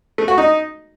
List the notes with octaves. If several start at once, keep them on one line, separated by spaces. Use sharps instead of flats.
A3
F#4
D#4